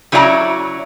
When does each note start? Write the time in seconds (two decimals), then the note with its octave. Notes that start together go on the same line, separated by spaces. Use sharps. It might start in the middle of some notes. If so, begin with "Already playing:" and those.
0.12 C#3 F#3 E4 D5 D#5 A#5